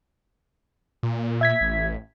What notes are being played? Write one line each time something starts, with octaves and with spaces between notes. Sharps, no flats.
A#2
E5 G#6 B6
A1